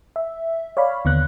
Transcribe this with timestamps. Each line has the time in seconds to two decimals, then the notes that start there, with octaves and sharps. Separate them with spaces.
0.16 E5
0.77 C#5 D5 F5 B5
1.05 D#2 D3 B3 F#6